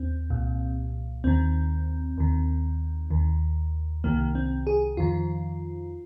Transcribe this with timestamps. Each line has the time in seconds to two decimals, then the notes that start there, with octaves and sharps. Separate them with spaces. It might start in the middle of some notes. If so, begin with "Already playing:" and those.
Already playing: D#2 C4
0.30 C2 A#2
1.24 D#2 D#3 C4
2.18 D#2 D#3
3.10 D#2 D#3
4.04 C2 C3 D#3 A#3
4.35 C4
4.67 G#4
4.97 F2 D#3 F4